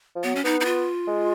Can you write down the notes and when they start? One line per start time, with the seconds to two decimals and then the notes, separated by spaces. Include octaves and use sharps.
0.15 F3
0.24 F#3 B3
0.35 C#4
0.44 B3 D#4
0.61 D#4
0.65 F4
1.07 G#3